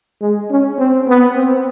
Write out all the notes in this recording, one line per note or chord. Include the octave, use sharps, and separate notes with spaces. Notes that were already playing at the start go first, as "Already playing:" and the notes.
G#3
C#4
C4
B3
C4